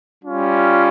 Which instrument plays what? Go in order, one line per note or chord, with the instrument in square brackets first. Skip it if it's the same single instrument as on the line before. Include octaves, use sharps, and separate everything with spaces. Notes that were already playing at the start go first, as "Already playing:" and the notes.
[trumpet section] G3 C#4 F4